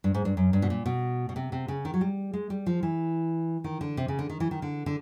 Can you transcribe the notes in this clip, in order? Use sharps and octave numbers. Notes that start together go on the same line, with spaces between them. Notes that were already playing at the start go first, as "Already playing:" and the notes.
G2
G#2
G2
F#2
G2
B2
A#2
B2
B2
C3
C3
C#3
D#3
F#3
G3
G#3
G3
F3
E3
D#3
D3
C3
C#3
D3
D#3
E3
D#3
D3
D3